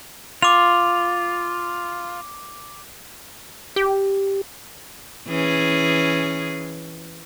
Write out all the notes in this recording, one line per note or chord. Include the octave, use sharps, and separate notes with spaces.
F4 D6 F7
G4
E3 C#4 G#4